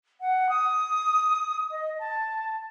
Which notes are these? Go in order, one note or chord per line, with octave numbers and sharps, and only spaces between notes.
F#5
D#6
D#5
A5